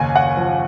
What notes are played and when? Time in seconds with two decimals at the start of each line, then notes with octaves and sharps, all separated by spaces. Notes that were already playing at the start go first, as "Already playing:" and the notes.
Already playing: F#1 D#2 G#5
0.16 F#5
0.37 F3